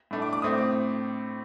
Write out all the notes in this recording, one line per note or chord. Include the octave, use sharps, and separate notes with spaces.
A2 A3 D4
D6
D6
A2 A3 C4 D#6
D6